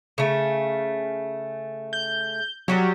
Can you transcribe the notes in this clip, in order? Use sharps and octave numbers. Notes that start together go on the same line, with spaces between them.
C#3 A3
G6
F#3 G3 F#4 G4